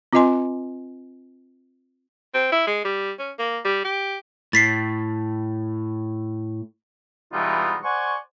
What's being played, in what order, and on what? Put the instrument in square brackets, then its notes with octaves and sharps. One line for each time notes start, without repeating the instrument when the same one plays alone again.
[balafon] C4 F4 B4 D#5 G#5 C6
[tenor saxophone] C4
E4
G#3
G3
C#4
A#3
G3
G4
[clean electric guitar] A2 [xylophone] A6 B6 C7
[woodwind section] B2 E3 G3 G#3 D#4 F4
C5 D5 F#5 G#5 C#6